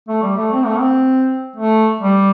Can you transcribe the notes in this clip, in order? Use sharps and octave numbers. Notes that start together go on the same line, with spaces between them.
A3
G3
A3
C4
A3
C4
A3
G3